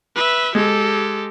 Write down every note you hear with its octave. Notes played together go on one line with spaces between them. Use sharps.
B4 E5
G#3 G4 A4